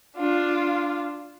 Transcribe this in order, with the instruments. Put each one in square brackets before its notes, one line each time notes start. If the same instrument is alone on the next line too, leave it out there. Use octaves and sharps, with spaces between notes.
[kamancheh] D4 F4